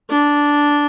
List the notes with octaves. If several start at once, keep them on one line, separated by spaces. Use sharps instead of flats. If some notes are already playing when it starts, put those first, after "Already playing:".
D4